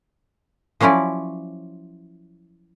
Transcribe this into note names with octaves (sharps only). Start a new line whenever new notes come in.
F3 F#3 C#4 E4 D5